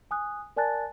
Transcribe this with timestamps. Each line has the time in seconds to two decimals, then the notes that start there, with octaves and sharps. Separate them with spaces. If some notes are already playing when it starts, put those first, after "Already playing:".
0.11 G#5 D#6 F#6
0.57 A#4 D5 G#5 A5 F#6 A6